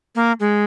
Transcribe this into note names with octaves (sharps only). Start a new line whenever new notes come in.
A#3
G#3